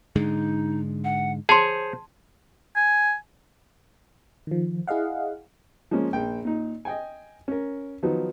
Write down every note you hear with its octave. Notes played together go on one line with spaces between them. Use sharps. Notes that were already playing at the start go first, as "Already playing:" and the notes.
G#2 D3 G#3 D#4
F#5
G#4 C5 C#5 A5 C6
G#5
D#3 F3
E4 G#4 D#5 F5 F#5
F3 G#3 A#3 C#4
A#1 G5
A#2 D#4
D#5 G5 G#5
C#4 A#4
D#3 F3 F#3 B3 D#4